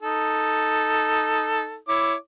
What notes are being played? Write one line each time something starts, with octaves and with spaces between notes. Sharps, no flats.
D#4 A4
E4 C#5 D6